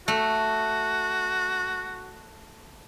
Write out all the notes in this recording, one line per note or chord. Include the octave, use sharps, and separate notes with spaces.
A3 F#4